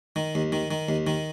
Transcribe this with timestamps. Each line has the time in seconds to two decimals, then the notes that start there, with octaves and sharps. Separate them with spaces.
0.16 D#3
0.35 D#2
0.52 D#3
0.71 D#3
0.89 D#2
1.07 D#3